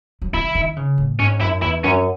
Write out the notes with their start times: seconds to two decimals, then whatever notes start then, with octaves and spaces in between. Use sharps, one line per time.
0.22 F#3
0.33 E3 E4
0.55 D#3
0.77 C#3
0.98 A2
1.19 G#2 C#4
1.41 F#2 E4
1.62 E2 E4
1.84 F#2 C#4